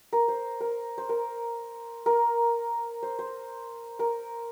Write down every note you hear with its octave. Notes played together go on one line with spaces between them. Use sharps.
A#4
C5
A#4
C5
A#4
A#4
C5
C5
A#4